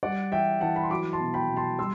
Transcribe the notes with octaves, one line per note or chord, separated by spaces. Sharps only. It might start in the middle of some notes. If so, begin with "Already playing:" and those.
G3 D5 F#5
E3 E5 G5
E3 F#5 A5
B5
C6
F#3 B5 D6
A5 C6
B2
G5 B5
B2
A5 C6
G3 C6 E6